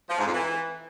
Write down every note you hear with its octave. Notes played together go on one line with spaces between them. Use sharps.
F3
G#2
F2
E3